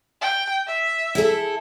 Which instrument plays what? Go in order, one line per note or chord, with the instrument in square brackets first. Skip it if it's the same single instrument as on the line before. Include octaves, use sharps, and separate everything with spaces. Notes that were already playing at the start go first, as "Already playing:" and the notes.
[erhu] G5
E5
[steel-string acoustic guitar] E4 G#4 A4